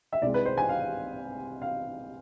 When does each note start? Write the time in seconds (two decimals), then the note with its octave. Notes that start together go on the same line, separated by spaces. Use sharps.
0.12 E5
0.22 C2 C3 G#3 D5
0.34 B4
0.45 C5
0.58 G#5
0.69 F5
1.62 F5